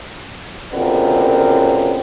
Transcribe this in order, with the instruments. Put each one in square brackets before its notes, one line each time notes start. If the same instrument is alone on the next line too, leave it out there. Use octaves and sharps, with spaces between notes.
[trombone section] C#2 F#2 A#2 D3 B3 C4